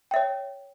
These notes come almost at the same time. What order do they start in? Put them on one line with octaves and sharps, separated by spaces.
G5 E5 C#5